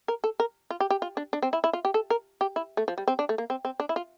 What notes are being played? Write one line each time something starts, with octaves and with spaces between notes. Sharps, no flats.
A#4
A4
A#4
F4
G4
G4
F4
D4
D4
C4
E4
E4
F4
G4
A4
A#4
G4
E4
A3
F3
G3
C4
D4
A3
A#3
C4
C4
D4
E4
F4